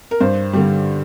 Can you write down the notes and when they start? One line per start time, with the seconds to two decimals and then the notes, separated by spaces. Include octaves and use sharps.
0.11 A#4
0.21 G2 C5
0.53 D3 G3